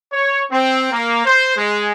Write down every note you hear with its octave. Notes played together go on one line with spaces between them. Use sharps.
C#5
C4
A#3
C5
G#3